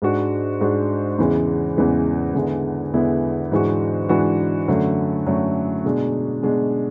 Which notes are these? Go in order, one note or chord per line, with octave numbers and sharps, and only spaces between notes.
G#2 G#3 D4 F#4
G#2 G#3 D4 F#4
E2 C#3 E3 G#3
E2 C#3 E3 G#3
E2 D3 G#3 B3 E4
E2 D3 G#3 B3 E4
G#2 E3 G#3 D4 F#4
G#2 E3 G#3 D4 F#4
F#2 D3 F#3 A3
F#2 D3 F#3 A3
B2 G#3 D4
B2 G#3 D4